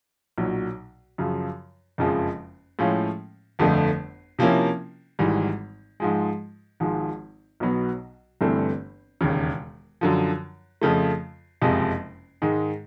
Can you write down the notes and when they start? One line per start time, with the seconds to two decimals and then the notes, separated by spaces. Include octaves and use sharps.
0.38 B1 A#2 F#3
1.18 F#2 C#3 F3
1.98 F#1 F2 C#3 F3 G#3
2.79 A2 F3 G#3 C#4 F4
3.59 G1 F2 D3 F3 A3
4.39 C3 F3 A#3 C#4 E4
5.19 G#1 G#2 E3 G3
6.00 G#2 F3 G#3
6.80 G#1 G#2 F3 G#3
7.60 B1 B2 F#3 B3
8.41 G1 G2 E3 A3 C4
9.21 E1 D#2 C#3
10.01 F#2 D3 F3
10.82 F2 C#3 F3 A3
11.62 F#1 F2 C3 F3 G#3
12.42 G#2 D#3 G#3